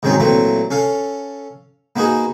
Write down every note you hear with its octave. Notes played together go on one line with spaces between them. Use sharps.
G#2 D#3 F#3 C4 C#4 D#4
A#2 E3 F#3 A3 C4
C#4 A4 F5
A#3 B3 D#4 F#4 G#4